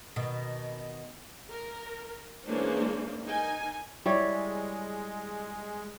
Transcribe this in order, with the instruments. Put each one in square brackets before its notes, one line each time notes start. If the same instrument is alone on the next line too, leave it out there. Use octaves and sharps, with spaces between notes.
[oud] B2 D#3
[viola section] A#4
E3 G#3 A#3 C#4 D4 C5
D#4 A#4 G#5
[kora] G3 E4 C#5 [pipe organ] G#3